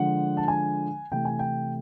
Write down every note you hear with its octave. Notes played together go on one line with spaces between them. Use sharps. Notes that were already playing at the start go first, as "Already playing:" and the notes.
Already playing: D3 F3 G#3 F#5
A5
G#5
C3 E3 A3 G5
G#5
G5